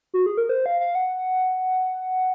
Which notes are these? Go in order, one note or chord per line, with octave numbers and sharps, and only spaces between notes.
F#4
G#4
A#4
C5
F5
F5
F#5